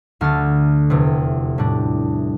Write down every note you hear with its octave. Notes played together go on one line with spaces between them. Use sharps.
D2 D3 A3 F6 A6
F1 E2 C3
A2 G3 D4